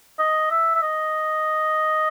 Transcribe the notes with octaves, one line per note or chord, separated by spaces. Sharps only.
D#5
E5
E5
D#5